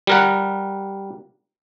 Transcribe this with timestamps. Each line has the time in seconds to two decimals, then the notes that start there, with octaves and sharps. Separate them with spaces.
0.07 G3 A#4 F#5